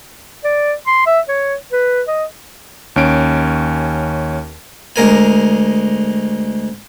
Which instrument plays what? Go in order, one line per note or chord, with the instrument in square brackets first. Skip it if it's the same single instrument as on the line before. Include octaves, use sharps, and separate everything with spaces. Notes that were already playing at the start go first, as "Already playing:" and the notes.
[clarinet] D5
C6
E5
C#5
B4
D#5
[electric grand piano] D#2 C#4 D7
[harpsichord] D2 G#3 A#4 G#5